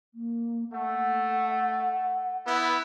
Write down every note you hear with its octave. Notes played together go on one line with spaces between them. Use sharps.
A#3
A3 F#5
B3 E4